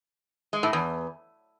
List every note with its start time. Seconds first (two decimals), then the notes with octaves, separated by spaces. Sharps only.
0.53 G#3
0.63 A2
0.73 E2